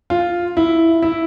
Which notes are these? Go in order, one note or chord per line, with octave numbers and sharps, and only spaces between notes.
F4
E4
E4